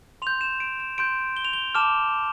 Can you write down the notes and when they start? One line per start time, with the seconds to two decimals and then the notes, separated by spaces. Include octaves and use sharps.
0.22 C6 F7
0.27 G6
0.41 E7
0.60 D7
0.80 E7
0.98 C6 G6 D7
1.37 G7
1.45 F7
1.53 G7
1.75 A5 D6 F6 E7